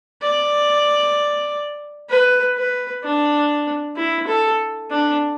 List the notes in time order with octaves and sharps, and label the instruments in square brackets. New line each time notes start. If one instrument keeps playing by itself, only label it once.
[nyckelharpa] D5
B4
B4
D4
E4
A4
D4